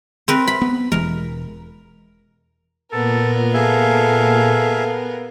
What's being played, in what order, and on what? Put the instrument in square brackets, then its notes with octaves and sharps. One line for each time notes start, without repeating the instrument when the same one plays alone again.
[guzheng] C4 A#4 B4
B5
[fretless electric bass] B3
[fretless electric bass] E1 E3 G#3 [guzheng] A#4
[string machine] A#2 [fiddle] B3 A#4 [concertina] A4
[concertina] G#4 E5 [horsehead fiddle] A4 F5